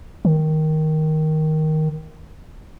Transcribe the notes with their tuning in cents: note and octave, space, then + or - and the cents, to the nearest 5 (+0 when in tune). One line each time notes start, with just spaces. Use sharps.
D#3 +5